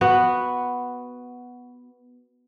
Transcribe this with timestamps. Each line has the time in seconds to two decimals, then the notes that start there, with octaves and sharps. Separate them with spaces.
0.01 B3 F#4